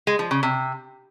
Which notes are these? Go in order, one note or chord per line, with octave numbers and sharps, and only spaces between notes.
G#3
F3
C#3
C3